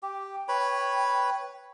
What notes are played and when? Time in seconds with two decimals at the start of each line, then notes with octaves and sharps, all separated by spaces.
0.03 G4 G5
0.48 B4 C#5 B5